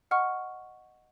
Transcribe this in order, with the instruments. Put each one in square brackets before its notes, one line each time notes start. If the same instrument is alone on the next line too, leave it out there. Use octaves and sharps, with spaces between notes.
[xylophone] D#5 F#5 C#6 F6